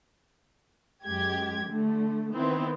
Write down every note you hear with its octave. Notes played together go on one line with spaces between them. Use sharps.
F#2 G#3 G4 G#6
D3 A3
D#3 B3 C4 E4